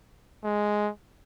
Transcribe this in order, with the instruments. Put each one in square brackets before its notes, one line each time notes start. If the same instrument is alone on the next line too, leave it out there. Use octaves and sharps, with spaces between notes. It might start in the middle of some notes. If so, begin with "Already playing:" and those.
[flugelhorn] G#3